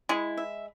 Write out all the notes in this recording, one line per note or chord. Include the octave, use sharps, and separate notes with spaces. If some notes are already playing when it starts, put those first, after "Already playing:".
G#3 E4
E5